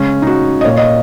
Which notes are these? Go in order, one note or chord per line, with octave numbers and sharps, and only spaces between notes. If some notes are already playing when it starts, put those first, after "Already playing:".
Already playing: C#3 G#3 C#4
D#4
F#4
D#5
A#2 A#3 C#5
D#5